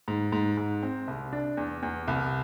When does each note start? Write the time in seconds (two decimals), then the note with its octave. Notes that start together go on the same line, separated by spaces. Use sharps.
0.08 G#2
0.32 G#2
0.57 G#2
0.82 C4
1.08 C2
1.33 D4
1.57 E2
1.83 E2
2.08 C2